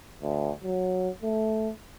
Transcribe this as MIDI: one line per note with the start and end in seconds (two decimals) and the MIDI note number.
0.22 0.51 38
0.64 1.09 54
1.23 1.70 57